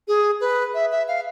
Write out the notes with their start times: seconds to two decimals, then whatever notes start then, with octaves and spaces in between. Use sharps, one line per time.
0.08 G#4
0.41 B4
0.74 E5
0.92 E5
1.08 F5